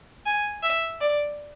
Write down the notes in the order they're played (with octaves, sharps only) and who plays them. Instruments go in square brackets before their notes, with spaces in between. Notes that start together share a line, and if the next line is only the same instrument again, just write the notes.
[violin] G#5
E5
D5